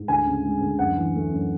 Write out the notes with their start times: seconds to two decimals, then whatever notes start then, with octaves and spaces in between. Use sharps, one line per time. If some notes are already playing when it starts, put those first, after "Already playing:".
Already playing: G#2
0.08 D2 G#5
0.26 C#3
0.44 G#3
0.61 D2
0.78 F#2 F#5
0.96 E3
1.14 A3
1.31 F#2